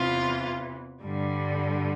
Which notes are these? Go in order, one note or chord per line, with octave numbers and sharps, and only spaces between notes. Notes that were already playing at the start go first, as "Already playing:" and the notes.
Already playing: E2 C3 E3 F4
G2 D3 G3